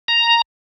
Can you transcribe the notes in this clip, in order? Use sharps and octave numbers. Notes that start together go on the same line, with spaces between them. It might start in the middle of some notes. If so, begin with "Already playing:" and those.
A#5